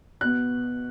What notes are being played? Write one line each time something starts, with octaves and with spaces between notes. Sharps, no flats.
B2 B3 F#6